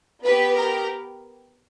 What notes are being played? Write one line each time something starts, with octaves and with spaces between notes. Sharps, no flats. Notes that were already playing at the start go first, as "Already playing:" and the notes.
B3 G4 B4
A#4